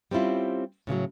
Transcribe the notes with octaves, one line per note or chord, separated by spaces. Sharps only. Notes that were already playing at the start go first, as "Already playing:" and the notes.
G3 C4 C#4 E4 F4
A2 C#3 E3 F#3